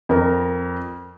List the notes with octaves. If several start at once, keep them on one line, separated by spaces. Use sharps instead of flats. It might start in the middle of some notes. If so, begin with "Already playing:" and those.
F2 A#4